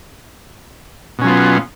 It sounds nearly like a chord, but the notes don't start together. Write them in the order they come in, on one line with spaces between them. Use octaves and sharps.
B2 C#4 F#3 F4 B3